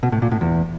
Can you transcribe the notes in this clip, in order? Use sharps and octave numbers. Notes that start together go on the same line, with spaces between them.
B2
A2
A#2
A2
E2